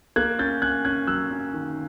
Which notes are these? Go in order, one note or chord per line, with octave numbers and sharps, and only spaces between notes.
A#3 F#6 G#6
C#4 G6 A6
C#4 F#6 G#6
C#4 F#6 G#6
F#3 E6 F#6
C#4
D#3